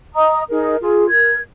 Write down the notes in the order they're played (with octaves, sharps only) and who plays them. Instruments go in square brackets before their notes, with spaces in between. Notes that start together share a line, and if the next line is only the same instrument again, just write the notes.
[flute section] D#5 A#5 D#6
D#4 G#4 A#4
F4 G#4
A#4 G#6